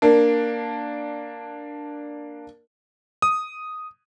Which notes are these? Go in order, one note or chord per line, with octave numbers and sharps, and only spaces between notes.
A#3 D4
D#6